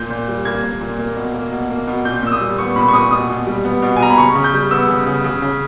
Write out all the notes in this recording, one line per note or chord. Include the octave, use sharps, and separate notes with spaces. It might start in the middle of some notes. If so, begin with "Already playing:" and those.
Already playing: A#2 G6
A#2
G3
A#3 G#6
A#2
A#2
A#3
B2
A#3
B2
A#3
B2
A#2 G6
A#2 E6
D#6
G3
B3 C#6
A#2 B5
C#6
A#2 D#6
B2 D#6
B2
G3
B3
B2
G#5
B2 A#5
B5
C#3 C#6
C#3
G6
G3
B3 E6
C#3
C#3
C#3
C#3